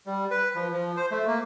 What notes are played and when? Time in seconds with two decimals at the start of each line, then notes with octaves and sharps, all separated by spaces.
0.06 G3
0.31 B4
0.55 F3
0.72 F3
0.97 C5
1.11 A3
1.27 A#3